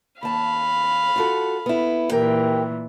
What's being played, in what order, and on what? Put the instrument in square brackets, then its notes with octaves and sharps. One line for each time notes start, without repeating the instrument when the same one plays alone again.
[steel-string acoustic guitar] D#2 A5 [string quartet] F5 B5
[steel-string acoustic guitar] F4 F#4 A4
B3 E4
[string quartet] A#2 E3 [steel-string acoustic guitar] G4 A#4 G5